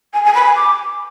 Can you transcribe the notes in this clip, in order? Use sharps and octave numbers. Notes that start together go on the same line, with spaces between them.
G#5
G#5
B5
G#5
D6